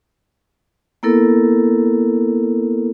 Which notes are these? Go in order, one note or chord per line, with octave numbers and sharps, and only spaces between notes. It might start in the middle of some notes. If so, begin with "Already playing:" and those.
A#3 B3 E4 A4 A#4